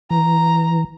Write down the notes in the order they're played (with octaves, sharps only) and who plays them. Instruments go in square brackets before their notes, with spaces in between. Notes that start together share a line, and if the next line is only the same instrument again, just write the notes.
[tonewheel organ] E3 [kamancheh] A#5